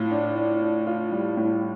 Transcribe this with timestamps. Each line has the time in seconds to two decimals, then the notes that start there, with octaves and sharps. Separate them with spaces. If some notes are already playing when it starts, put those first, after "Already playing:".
Already playing: A2 F4
0.11 D4
0.36 D4
0.61 D4
0.87 F4
1.12 G3
1.37 A2